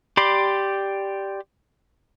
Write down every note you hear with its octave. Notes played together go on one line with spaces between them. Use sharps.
G4 D5 B5 C6